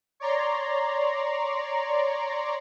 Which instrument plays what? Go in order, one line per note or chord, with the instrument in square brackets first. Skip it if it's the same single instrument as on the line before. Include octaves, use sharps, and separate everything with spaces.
[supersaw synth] C#5 D5 A#5 C6